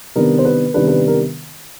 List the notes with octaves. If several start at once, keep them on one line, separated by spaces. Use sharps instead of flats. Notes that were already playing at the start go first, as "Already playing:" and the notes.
C3 D#3 G3 B3 D4 A#4
C5
B4
C3 D#3 G3 B3 D4 B4
B4
A#4